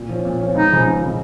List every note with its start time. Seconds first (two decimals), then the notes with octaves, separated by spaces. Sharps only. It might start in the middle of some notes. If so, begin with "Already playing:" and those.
Already playing: A#2
0.09 F3 C#4
0.25 A#2
0.40 F3 C#4
0.55 C#2 D#4
0.71 C#3 F3
0.86 C#2
1.01 C#3 F3